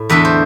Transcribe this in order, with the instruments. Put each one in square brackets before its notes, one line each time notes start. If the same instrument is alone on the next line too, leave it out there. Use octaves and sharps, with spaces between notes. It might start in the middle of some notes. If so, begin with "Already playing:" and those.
Already playing: [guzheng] A2
E2 D3 A3 B4
C5